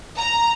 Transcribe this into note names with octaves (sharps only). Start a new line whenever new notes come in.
A#5